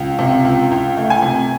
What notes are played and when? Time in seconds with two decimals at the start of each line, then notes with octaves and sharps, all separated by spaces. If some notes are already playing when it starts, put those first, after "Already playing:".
Already playing: C#2
0.19 C3
0.45 C#2
0.71 C#2
0.97 A3
1.10 G#5
1.22 C3